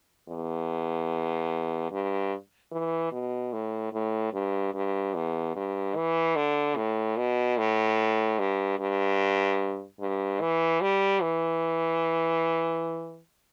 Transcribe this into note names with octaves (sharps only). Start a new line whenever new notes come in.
E2
G2
E3
B2
A2
A2
G2
G2
E2
G2
E3
D3
A2
B2
A2
G2
G2
G2
E3
G3
E3